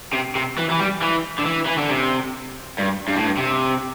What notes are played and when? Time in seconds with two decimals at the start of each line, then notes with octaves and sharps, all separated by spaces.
0.13 C3
0.35 C3
0.58 E3
0.70 E3
0.80 G3
1.02 E3
1.39 D3
1.46 E3
1.67 E3
1.78 D3
1.90 C3
2.79 G2
3.08 G2
3.16 A2
3.25 G2
3.37 C3